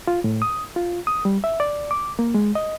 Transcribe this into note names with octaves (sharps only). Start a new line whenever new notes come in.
F4
A2
D#6
F4
D#6
G3
E5
D5
D6
A#3
G#3
D#5